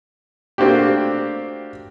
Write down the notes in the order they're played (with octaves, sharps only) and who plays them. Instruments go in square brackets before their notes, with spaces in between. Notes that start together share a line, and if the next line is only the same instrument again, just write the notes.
[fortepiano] A3 A#3 C4 D4 F#4 G4